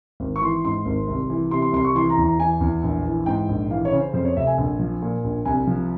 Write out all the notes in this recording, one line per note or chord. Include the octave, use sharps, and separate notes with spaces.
G#1
C#6
E3 C6
G#2 C6
G#1
C2
E3
C3 C6
C6
C2 C6
C#6
E3 C6
A#5
E2
A#5
E3 G#5
E2
A#1
E3
G#2 G5
A#1
E3 F5
C#5
C#3
C5
F2 C5
C#5
F1 E5
G#5
A#1
F3
A#2
A#1
C2 G#5
F3